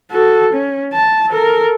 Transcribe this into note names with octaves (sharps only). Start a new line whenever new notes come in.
F#4 A4
C#4
A5
A4 A#4